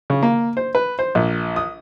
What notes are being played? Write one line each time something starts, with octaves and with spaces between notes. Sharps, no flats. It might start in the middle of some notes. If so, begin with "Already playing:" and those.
C#3
A#3
C5
B4
C5
A#1
D#6